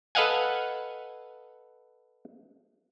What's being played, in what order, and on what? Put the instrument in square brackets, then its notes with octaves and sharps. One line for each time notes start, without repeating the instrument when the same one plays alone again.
[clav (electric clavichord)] A4 B4 D#5 F5 F#5 G#5